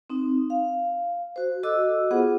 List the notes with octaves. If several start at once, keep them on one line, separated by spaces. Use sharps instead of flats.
C4 D#4
F5
F#4 C5
F#4 A4 D#5 D6 E6
B3 F4 G#4 C5 F#5